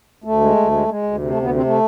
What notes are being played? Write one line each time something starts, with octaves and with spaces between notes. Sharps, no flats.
D2 A3
G#3
D2
G#3
G#3
D2
C3
A3
D2
B3
C3 C4
A3